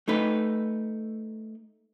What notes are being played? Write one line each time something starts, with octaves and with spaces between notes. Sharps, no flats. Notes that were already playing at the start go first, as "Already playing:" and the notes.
A3 D#4 B4